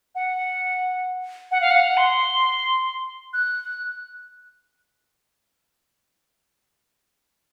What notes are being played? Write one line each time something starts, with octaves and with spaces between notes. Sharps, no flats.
F#5
F#5
F5
F#5
C6
F#6